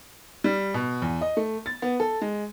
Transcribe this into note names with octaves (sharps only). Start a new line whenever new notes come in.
G3
B2
E2
D#5
A3
A6
B3
A4
G#3